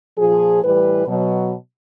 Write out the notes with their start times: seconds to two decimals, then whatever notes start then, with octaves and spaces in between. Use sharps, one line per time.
0.17 A#2 F3 G#4
0.62 A2 E3 G3 B4
1.07 B2 F#3